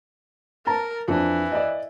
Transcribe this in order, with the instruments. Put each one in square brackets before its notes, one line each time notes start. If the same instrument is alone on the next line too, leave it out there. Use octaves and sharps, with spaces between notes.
[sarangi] A#4 [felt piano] A5 A#5
[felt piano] F2 D4 [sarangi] E3
[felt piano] D5 D#5